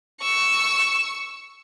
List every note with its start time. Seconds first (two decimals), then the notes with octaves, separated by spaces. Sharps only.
0.20 C#6 E6